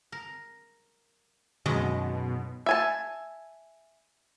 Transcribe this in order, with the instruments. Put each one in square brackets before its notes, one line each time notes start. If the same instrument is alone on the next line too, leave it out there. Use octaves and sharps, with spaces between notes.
[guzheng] A#4
[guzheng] F#2 D#3 G#3 [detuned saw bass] B2
[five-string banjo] E5 G#5 A5